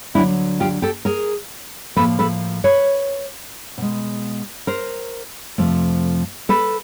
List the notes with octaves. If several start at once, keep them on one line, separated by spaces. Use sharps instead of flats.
D2 D3 F#3 D4 E4
F4 G4
G4 A4
G#4 A#4
A2 F3 A#3 A4 B4
A4 B4
B4 C#5
B2 G#3
A#4 C5
F2 C3 F3 A3
A4 B4